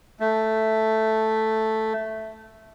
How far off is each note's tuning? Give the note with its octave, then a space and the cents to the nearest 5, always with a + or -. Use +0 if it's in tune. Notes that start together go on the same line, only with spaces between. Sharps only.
A3 +0